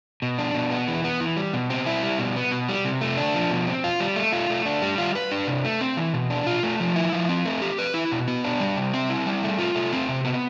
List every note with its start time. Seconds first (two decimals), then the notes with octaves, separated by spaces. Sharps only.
0.22 B2
0.39 D4
0.55 B2
0.71 B3
0.88 E3
1.04 B3
1.20 E3
1.37 G3
1.53 B2
1.70 C4
1.86 E4
2.03 G3
2.19 B2
2.36 B3
2.52 B2
2.69 G3
2.85 C3
3.01 A3
3.17 D4
3.34 F3
3.51 B2
3.67 C4
3.84 F4
4.00 G3
4.16 A3
4.32 F4
4.50 A3
4.66 D4
4.82 G3
4.98 F4
5.15 B4
5.31 D4
5.47 C3
5.64 A3
5.81 C4
5.97 E3
6.14 B2
6.30 D4
6.46 F4
6.63 A3
6.80 F3
6.96 E4
7.12 F3
7.29 C4
7.46 A3
7.62 G4
7.79 B4
7.94 E4
8.12 B2
8.28 B3
8.44 D4
8.60 G3
8.77 C3
8.94 C4
9.09 E4
9.26 G3
9.43 A3
9.59 F4
9.75 A3
9.92 C4
10.09 C3
10.24 B3